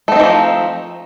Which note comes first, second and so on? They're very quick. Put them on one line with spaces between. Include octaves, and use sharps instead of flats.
A3 C4 D#4 E3 F3